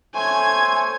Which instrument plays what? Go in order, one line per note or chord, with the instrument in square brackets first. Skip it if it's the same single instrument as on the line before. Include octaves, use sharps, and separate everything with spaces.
[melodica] A3 C5 C#5 [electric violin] G#5 G#6